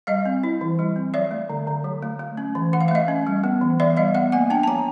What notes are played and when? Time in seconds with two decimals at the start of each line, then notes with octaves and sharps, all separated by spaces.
0.07 G3 D#5 F5
0.25 C4
0.43 E4
0.61 E3
0.79 G3
0.96 C4
1.14 F#3 D5 E5
1.31 A3
1.49 D3
1.67 D3
1.84 F#3
2.02 A3
2.19 A3
2.37 C#4
2.55 E3
2.73 E3 F#5
2.81 F5
2.88 E5
2.91 A3 D#5 F5
3.08 C#4
3.27 G3
3.44 B3
3.61 E3
3.80 E3 D5 E5
3.97 G3 D#5 F5
4.14 B3 E5 F#5
4.32 A#3 F#5 G#5
4.50 D4 G5 A5
4.63 A5
4.68 F3 G#5 A#5